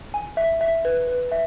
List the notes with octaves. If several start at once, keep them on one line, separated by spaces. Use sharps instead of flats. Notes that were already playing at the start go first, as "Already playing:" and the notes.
G#5
E5
E5
B4
B4
E5